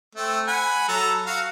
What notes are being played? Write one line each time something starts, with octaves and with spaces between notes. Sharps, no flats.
A3 C4
F#5 G#5 B5
F#3 A4 A#5
F#4 F5